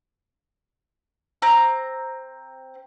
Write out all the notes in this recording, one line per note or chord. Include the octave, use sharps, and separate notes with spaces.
C4 A#5 F#6